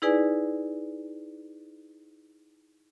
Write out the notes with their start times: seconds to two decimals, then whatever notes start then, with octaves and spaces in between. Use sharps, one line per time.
0.02 D#4 E4 G#4 B4 D5 G#5